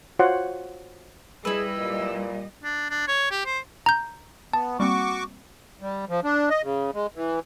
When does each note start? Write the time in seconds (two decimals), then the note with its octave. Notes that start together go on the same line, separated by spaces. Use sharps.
0.19 F4 F#4 C5 C#5 F#5 C6
1.45 G3 E4 G#4 B4 D#5 E6
1.77 A#2
2.64 D4
2.90 D4
3.08 C#5
3.31 G4
3.46 C5
3.86 A#5 G6
4.53 B3 A5
4.80 G3 A#3 C4 F#4 C#6 D6
5.81 G3
6.09 F3
6.24 D4
6.50 D#5
6.63 C#3
6.94 G#3
7.15 E3